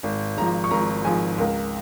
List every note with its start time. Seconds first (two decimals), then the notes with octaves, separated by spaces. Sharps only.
0.03 G#1
0.37 G#2 F3 A#5
0.64 C#6
0.71 G#1 A#5
1.05 G#2 F3 G#5
1.38 C#2 A#4